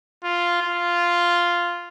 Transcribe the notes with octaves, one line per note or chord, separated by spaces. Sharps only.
F4
F4